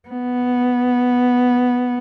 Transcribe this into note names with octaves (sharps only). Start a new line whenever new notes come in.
B3